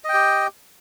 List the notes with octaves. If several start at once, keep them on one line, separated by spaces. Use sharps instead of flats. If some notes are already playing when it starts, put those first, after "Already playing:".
G4 D#5 G5